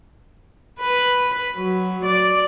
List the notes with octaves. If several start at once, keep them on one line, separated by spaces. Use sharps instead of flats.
B4
F#3
D5